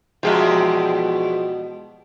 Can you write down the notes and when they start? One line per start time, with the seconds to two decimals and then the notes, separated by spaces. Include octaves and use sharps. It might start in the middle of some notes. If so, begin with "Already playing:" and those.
0.23 E2 B2 F3 G#3 F#4 G4 E5